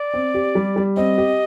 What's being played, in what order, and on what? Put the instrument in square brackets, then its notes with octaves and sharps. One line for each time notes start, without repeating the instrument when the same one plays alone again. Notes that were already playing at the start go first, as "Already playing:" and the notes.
Already playing: [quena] D5
[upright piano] C4
G4
G3
G3
[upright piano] C4 [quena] D#5
[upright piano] G4